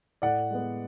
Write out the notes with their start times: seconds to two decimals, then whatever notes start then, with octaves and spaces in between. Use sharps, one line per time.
0.22 A2 D5 F#5
0.50 G#3 B3